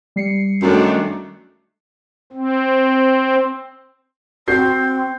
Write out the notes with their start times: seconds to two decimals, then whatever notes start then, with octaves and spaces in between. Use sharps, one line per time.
0.16 G3 C7 C#7
0.62 F#2 D#3 A3 D4 F#4
2.33 C4
4.48 C4 F#4 G6 C7